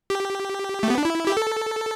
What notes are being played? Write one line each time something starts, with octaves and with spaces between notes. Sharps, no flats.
G4
A3
B3
D4
E4
G4
A4